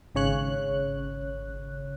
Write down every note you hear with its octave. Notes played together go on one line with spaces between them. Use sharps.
G#1 C#3 C#5 F#6